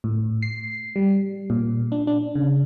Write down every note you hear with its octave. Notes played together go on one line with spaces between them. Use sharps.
A2
C7
G3
A#2
D4
D4
C#3